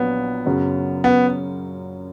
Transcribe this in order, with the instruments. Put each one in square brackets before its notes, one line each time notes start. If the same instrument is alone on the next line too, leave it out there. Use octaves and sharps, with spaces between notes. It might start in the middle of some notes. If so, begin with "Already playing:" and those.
Already playing: [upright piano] A#1 A#2 F#3 C#4 [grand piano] B3
[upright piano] F#2 C#3 F#3
[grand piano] B3